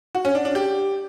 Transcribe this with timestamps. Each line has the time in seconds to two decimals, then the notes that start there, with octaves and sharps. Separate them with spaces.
0.15 F#4
0.25 C#4
0.35 D4
0.45 D4
0.55 G4